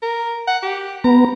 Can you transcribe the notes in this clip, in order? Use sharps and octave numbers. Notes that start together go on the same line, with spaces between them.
A#4
F#5
G4
B3 A#5